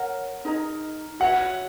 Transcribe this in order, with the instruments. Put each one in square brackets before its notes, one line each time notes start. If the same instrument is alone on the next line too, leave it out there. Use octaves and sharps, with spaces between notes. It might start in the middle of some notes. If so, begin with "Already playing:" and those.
Already playing: [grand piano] A#4 [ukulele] C#5 F#5
[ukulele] D#4 G#4 D#5 A#5
[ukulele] F#4 C#5 E5 [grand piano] F#5